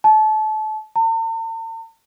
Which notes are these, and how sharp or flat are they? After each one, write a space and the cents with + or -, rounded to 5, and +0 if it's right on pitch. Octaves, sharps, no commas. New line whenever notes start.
A5 -30
A5 +45